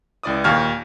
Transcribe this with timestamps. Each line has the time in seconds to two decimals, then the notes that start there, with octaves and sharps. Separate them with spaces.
0.23 C#2 E4 D5 D6 D#6
0.44 D#2 A#2 F5 C#6 F6 G#6